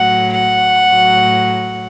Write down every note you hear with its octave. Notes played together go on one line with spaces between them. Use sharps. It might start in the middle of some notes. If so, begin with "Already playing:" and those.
Already playing: A2 F#3 F#5
F#5
A2 F#3